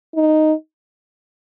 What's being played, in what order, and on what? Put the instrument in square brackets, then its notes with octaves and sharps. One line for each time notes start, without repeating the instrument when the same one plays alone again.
[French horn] D#4